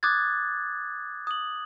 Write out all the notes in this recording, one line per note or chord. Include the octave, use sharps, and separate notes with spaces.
D6 D#6 F#6 G#6 A6
D#6 F#7